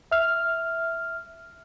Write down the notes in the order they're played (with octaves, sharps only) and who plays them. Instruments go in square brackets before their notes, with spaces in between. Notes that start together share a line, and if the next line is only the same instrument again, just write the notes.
[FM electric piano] E5 F6